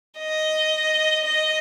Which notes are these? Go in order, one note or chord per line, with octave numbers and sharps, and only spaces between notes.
D#5
D#5